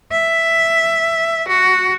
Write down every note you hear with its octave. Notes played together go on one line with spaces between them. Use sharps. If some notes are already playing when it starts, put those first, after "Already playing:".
E5
F#4